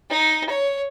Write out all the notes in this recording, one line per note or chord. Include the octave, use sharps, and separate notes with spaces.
D#4
C#5